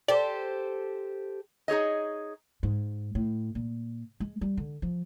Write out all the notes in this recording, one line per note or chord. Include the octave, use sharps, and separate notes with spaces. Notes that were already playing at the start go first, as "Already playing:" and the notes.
G4 A4 C5 D5
D#4 G#4 C#5 D#5
G#2
A2
A#2
G#3
G3
D3
F3